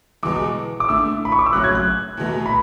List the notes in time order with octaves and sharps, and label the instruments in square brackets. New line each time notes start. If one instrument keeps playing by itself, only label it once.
[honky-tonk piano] E2 B2 G#3 [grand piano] D6
[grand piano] D6
[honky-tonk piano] D3 A3 E4 [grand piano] E6
[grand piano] B5
C#6
D6
E6
[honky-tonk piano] F#2 C#3 F#3 A3 C#4 [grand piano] F#6
[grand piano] G#6
F#6
[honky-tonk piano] E2 B2 A3
[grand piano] B5